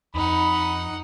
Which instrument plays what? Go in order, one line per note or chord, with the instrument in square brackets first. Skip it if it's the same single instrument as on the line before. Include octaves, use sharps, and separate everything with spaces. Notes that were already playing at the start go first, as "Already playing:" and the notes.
[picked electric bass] F2 [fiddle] D#4 F#5 [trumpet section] B5